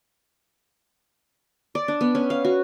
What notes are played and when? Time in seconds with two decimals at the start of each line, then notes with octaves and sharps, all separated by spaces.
1.75 D5
1.88 D4
2.01 B3
2.15 C#4
2.30 F5
2.45 F#4